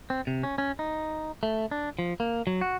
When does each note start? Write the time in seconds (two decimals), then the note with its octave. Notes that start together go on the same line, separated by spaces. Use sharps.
0.10 C4
0.27 C3
0.43 C#4
0.58 C#4
0.79 D#4
1.43 A3
1.71 D4
1.99 F3
2.20 A#3
2.47 F#3
2.61 F#4